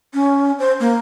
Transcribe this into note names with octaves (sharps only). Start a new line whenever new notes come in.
C#4
C5
A#3